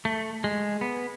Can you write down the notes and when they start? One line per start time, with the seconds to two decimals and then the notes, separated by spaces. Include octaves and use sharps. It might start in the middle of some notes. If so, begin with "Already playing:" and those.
0.05 A3
0.44 G#3
0.81 B3